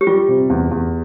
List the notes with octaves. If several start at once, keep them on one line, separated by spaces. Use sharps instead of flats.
G4
G3 F4
C3
E2
E2